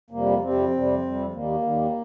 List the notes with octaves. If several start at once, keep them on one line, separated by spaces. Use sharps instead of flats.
F2 C3 G3 A#3
F2 C3 G3 C4
F2 C3 G3
F2 C3 G3
D#2 D#3 G3 A#3
D#2 D#3 G3